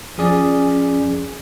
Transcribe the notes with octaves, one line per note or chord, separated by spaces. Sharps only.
F3 C#4 G#4 D5